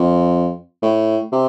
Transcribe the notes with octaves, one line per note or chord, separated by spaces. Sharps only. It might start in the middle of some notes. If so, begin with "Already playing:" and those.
Already playing: F2
A2
C3